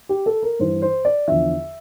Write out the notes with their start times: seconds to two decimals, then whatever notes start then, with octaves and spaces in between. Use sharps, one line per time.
0.09 G4
0.26 A4
0.43 A#4
0.59 G2 E3 C5
0.82 C5
1.05 D5
1.28 E2 D3 F3 E5